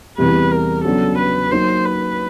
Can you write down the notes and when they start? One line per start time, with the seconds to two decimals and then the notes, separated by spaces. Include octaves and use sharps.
0.18 E2 C3 E3 G3 B4
0.51 A#4
0.84 C#3 F#3 B3 D4 A4
1.18 B4
1.51 F#3 A#3 D#4 C5
1.85 B4